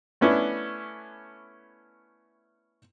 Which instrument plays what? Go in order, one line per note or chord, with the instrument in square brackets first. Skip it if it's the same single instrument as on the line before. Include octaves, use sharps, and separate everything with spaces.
[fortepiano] A3 B3 C#4 D4 E4